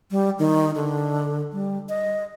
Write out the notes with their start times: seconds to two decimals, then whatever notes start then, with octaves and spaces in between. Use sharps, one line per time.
0.11 G3
0.39 D#3
0.75 D3
1.53 G3
1.89 D#5